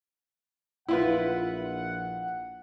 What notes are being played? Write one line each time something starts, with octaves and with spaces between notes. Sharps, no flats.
A#1 E4 F4 B4 F#5